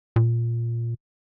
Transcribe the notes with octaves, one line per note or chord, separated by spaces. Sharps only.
A#2